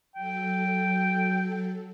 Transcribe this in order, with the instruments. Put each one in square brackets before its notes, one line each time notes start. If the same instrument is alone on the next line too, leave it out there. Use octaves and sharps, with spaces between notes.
[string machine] F#3 A4 [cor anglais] G5